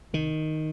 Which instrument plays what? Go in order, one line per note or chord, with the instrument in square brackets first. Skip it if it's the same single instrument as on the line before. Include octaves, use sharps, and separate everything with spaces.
[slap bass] C2 D#3